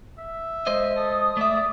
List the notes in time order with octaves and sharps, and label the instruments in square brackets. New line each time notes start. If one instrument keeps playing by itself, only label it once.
[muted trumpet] E5
[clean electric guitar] G#3 C5 D#5
[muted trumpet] A4 [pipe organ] D#6
[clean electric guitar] A3 E5 [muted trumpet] D5